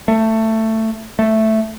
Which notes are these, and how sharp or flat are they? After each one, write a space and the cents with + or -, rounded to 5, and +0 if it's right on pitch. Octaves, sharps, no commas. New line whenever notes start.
A3 +15
A3 +0